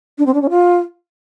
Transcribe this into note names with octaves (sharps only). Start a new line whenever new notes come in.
D4
C4
D4
C#4
F4